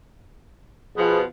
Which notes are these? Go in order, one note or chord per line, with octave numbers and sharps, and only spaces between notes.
B2 F3 B3 G#4